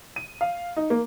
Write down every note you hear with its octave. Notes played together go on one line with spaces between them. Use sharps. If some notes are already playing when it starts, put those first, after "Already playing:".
D#7
F5
D#4
A#3